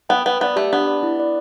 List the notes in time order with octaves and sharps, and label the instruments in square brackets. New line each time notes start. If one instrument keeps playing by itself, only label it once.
[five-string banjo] B3 [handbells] G5
[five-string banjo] B3 [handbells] B4
[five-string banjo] B3 [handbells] D5
[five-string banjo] A3 [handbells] G4
[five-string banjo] B3 [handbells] D4
[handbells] D5
E4
D5